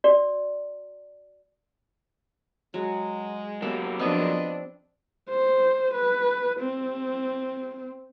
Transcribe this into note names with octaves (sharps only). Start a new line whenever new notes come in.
F#4 D5
F#3 G#3
F#3 A#3 B3 G4 A4
F3 B3 C4 D4 D#5
C5
B4
C4